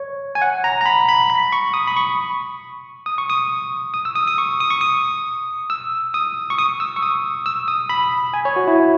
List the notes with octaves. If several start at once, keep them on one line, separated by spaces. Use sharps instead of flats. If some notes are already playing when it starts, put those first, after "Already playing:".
Already playing: C#5
G#5
F#5
A#5
A#5
B5
B5
B5
C#6
D#6
B5
C#6
D#6
C#6
D#6
D#6
E6
D#6
D#6
C#6
D#6
C#6
D#6
E6
D#6
C#6
D#6
E6
C#6
D#6
E6
D#6
B5
G#5
C#5
F#4
E4